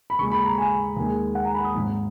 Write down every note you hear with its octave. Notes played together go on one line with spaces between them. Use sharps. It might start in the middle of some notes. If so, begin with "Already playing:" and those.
B5
D#2 C#3 G#3 C#6
B5
A#5
G#5
D#2 D#3 G#3
F#5
A#5
B5
D#6
G#1 G#2 F#3